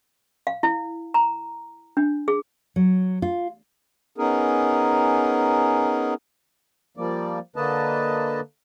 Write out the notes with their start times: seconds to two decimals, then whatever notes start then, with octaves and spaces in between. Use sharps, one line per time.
0.47 F5
0.63 E4
1.14 A#5
1.97 D4
2.28 G#4
2.76 F#3
3.22 F4
4.18 B3 C#4 D#4 G#4 A#4
6.97 F3 G3 A#3 D5
7.56 D3 A#3 B4 D#5 A5